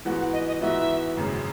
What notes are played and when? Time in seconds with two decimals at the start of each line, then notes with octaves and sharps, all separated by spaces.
0.05 G#2 E3 B3 F#4 F#5
0.19 F#5
0.33 D#5
0.47 D#5
0.61 G#2 E3 B3 F#4 E5
1.17 G#1 F#2 C#3